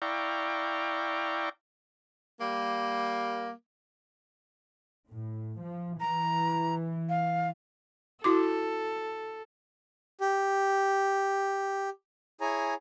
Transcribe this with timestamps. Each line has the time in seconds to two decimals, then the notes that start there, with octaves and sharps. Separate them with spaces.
0.02 E4 D5 F5 G5 A#5 C#6
2.40 G3 A#3
5.10 A2
5.59 F3
6.00 E3 A#5
7.09 F5
8.24 E4 F#4 A4 D6
10.21 G4
12.41 E4 G#4 C#5 G#5 A#5